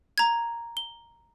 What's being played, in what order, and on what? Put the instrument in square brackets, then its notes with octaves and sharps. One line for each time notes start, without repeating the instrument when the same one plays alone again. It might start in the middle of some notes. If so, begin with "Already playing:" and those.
[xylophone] A#5 G#6
G7